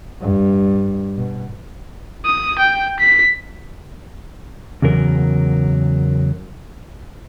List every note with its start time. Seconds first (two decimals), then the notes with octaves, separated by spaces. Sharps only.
0.21 G2
1.17 B2
2.25 D#6
2.59 G5
3.00 B6
4.82 E2 C#3 F#3 A#4